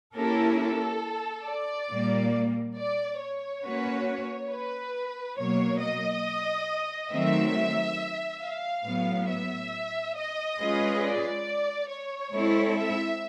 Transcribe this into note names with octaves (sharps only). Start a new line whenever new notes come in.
A#3 C#4 E4 G4 A4 A#4
A4
D5
A#2 G3 A#3
D5
C#5
A#3 C#4 F#4 B4
B4
B2 F#3 A#3 C#5
D#5
D#3 F#3 A3 C4 E5
F5
A2 F#3 B3
E5
D#5
G#3 C#4 F4 G#4 B4
D5
C#5
G#3 C4 E4 A4
E5